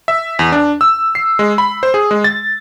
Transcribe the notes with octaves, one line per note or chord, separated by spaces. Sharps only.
E5
E2
D4
E6
C7
G#3
B5
C5
G#4
G#3
A6